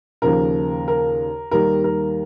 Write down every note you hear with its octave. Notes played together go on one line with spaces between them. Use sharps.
D#2 C#3 F3 A#4
A#4
D#2 D#3 G3 A#4
A#4